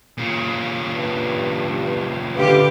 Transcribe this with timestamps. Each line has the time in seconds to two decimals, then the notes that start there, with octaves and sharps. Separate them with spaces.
0.18 A#2 C#3
0.94 G2
2.36 D3 A3 E4 F4 G4 B4